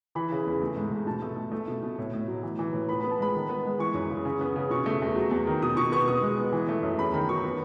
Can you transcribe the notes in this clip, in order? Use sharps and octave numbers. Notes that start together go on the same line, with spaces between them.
E3 B5
C#3
E2
A3
G#2
G#2
B2 A5
A3
A3
A3
B2
B2
A2
A2
F#3
E3
E3
A2
B3 B5
B3 B5
A5
G#3 B5
D#3
B3
G#3
E3 C#6
F#2
C#3
C#3
B3
C#3
B2 C#6
A3
E2
F#3
E2
D#3
B2 D#6
B2 C#6
B3 C#6
B2 D#6
G#3
B3
E3
A3
F#2
E2 B5
D#3 B5
F#3 C#6
B3